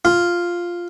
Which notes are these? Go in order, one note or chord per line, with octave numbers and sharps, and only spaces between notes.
F4